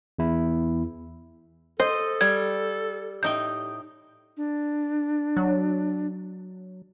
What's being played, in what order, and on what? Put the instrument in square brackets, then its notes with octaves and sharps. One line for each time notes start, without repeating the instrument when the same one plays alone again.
[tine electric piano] E2 E4
[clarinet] A4 [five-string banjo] C5 [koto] D#5
[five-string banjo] G3 [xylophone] G#6
[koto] A2 D#4 G5 [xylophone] G6
[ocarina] D4
[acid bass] F#3